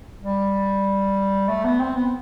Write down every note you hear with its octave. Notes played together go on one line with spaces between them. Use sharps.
G3
A3
B3
C4
B3